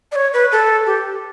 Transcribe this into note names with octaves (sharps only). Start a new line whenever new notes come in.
D5
C#5
B4
A4
G4